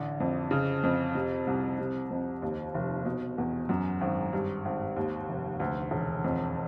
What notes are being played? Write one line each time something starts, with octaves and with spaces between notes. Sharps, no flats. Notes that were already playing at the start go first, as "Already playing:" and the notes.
Already playing: A1 D3
F2
C#3
F2
C3
C2
C3
F2
D#2
F1
B2
E2
F#2
G#1
G2
G#1
D#2
F1
D2
E1
F2